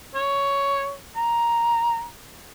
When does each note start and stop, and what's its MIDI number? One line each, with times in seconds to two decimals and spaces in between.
0.15 0.94 73
1.16 2.06 82